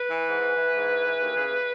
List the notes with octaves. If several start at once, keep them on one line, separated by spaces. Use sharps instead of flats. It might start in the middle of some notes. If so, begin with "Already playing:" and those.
Already playing: B4
E3
G#2
E3
E3
G#2
E3
E3
D#2
C#3